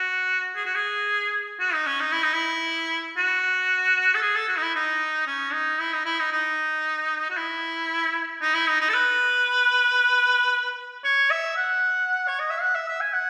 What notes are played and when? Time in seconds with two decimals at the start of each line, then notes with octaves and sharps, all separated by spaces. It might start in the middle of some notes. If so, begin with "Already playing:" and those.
Already playing: F#4
0.56 G#4
0.66 F#4
0.75 G#4
1.60 F#4
1.73 D#4
1.86 C#4
2.00 D#4
2.12 E4
2.23 D#4
2.33 E4
3.17 F#4
4.15 A4
4.22 G#4
4.35 A4
4.48 F#4
4.57 D#4
4.62 E4
4.75 D#4
5.27 C#4
5.53 D#4
5.79 E4
5.93 D#4
6.06 E4
6.19 D#4
6.32 D#4
7.31 F#4
7.37 E4
8.41 D#4
8.54 E4
8.67 D#4
8.81 D#4
8.89 A4
8.94 B4
11.04 C#5
11.31 E5
11.57 F#5
12.28 C#5
12.39 D#5
12.51 E5
12.61 F#5
12.75 E5
12.88 E5
13.01 G#5
13.13 F#5